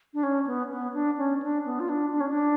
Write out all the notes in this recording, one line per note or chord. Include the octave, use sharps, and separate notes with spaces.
D4
C#4
B3
B3
D4
C#4
D4
B3
F4
D4
D4
C#4
D4